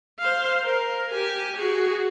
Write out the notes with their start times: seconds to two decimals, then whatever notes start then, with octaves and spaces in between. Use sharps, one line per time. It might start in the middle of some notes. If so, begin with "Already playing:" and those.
0.19 C5 F5
0.64 A#4
1.10 G4 G#5
1.57 F#4 G#4